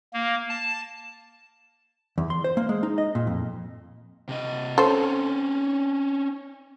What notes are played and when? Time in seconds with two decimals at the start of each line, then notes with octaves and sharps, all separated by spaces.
0.13 A#3
0.49 A5
2.18 E2
2.30 C6
2.44 C5
2.57 A#3
2.69 G#3
2.83 D#4
2.98 D#5
3.15 A#2
3.27 F2
4.29 C3 D#5
4.78 C4 C#4 A4 C5